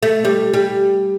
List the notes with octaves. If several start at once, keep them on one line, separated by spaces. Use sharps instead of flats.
A3
G3
G3